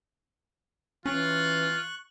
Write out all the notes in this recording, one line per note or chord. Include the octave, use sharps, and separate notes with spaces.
E3 C#4 F4 C#6 F#6